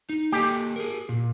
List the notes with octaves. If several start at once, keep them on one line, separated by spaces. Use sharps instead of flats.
D#4
A#3 G4 A4 D#5
G#4 A#4
A#2